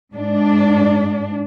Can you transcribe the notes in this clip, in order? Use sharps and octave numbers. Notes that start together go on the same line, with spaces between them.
G#2 D4